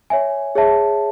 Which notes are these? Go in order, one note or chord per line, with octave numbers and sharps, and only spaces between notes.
C#5 E5 G#5
G#4 C#5 E5 A5